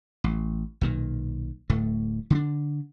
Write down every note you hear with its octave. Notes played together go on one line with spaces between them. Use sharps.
A1
B1 A#2 D#3
D1 A2 A3
D3 C4 D4